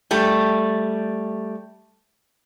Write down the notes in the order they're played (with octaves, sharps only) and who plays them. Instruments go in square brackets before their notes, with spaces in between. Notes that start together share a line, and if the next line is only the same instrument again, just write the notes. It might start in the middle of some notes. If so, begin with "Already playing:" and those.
[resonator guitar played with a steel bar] G3 A3